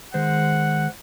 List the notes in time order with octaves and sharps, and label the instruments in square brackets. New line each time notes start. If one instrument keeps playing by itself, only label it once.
[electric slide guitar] D#3 G#3 C5 [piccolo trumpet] F#5